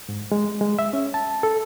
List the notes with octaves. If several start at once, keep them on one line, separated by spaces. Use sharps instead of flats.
G#2
G#3
G#3
E5
C#4
A5
A4